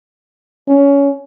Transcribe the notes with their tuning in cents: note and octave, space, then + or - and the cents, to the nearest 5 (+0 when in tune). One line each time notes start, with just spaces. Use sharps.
C#4 +20